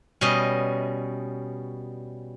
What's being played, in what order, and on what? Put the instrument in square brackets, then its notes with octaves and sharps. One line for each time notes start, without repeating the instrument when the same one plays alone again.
[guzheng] B2 G3 C#4 D#5